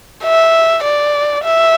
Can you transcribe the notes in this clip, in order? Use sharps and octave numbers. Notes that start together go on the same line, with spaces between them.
E5
D5
E5